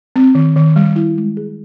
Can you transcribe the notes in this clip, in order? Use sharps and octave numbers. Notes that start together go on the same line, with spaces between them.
C4
D#3
D#3
G3
E4
G#3
G#4